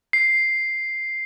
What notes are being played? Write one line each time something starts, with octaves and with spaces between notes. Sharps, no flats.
C7